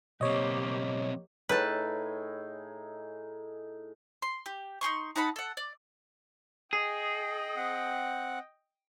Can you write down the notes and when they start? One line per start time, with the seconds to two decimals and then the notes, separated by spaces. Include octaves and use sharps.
0.21 B1 A#3 C4 G4 C#5 D#5
1.49 A2 D#4 G#4 B4 A5
4.22 C6
4.46 G4
4.81 D#4 G4 C6 C#6
5.16 D#4 F#5 A5 B5
5.36 A4 F#5
5.57 D5
6.73 G#4 D#5 G5
7.56 C4 F#5